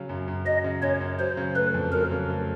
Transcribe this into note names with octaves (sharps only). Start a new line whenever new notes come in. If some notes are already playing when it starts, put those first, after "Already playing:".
Already playing: C#3 F#3
F#2
F#2
F#3 D#5
C#3
F#2 C#5
F#2
F#3 C5
C#3
A3 B4
F2
F#3 A#4
C#3
A3